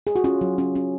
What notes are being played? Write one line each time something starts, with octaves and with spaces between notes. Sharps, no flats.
G#4
F#4
C#4 F4
F#3
C#4
C#4